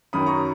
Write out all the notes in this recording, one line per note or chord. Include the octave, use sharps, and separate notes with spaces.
F#2 D#3 F#3 B5 D#6
A#5 C#6